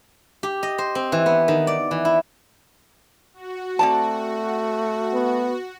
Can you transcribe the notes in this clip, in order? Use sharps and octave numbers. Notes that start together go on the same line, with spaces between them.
G4
D#5
C5
C4
E3
B3
D#3
D5
E3
E4
F#4
A3 C4 D5 A5
B3